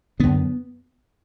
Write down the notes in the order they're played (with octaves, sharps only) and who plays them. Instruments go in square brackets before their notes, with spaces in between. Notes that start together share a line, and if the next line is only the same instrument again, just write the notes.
[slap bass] F#2 D3 B3